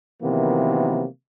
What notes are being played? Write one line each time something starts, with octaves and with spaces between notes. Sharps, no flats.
C3 D#3 E3 F#3 A#3 B3